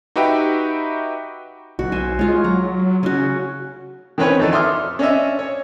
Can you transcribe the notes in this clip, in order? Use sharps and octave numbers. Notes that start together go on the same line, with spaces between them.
D#4 F#4 G4 B4 E5 G5
B1 F#4
C5 E5 G#5
G#3 F4 C#5
F#3 A#5
C#3 C#4 F#4
D#3 E3 C4 C#4 B4 C#5
F2 D#4 A4 D5
E5 C6 D6 D#6 F6
C#4 D4 D#5 E5
C#5